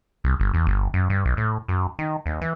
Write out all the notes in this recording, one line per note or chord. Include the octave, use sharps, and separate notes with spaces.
C2
G1
E2
G1
F#2
G2
B1
A2
F#2
D#3
D#2
E3